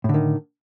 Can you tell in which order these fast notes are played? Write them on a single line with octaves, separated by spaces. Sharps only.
A2 D3 D#3